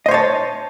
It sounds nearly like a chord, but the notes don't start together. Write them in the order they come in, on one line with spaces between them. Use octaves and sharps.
D#5 C5 C#5 A5